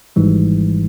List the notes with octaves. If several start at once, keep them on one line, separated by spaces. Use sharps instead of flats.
G#1 G#2 E3 G3